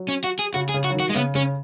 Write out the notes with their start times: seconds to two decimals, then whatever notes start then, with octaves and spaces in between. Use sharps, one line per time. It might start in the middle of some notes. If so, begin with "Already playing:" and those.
Already playing: F#3
0.08 C#4
0.24 F#4
0.39 G#4
0.54 C#3 F#4
0.69 G#4
0.74 C#3
0.84 F#4
0.90 F#3
0.94 D#3
1.00 F#4
1.09 G#3
1.15 C#3 B3
1.35 C#3 C#4